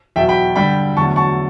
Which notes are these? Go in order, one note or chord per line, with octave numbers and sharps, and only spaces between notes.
E2 B2 F#3 E5 G5
G5 B5
G2 D3 G3 G5 B5
E2 D3 F#3 A3 A5 C#6
A5 C#6